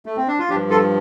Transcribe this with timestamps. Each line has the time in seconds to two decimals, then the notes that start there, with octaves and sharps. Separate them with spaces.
0.06 A3
0.17 C4
0.28 D4
0.39 F4
0.50 G2 F3 D4 G4
0.70 F4 A4